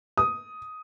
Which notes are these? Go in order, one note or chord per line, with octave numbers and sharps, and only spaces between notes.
D#6